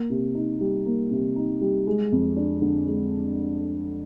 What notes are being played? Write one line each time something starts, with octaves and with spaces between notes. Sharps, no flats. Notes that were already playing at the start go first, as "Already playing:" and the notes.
Already playing: A#3
C3
D#4
G3
A#3
C3
D#4
G3
G#3
F2
D4
D3
G#3